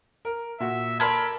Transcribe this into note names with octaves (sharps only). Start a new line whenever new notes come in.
A#4
A#2 F#4 E5
A4 A#4 D5 B5 C6 G#6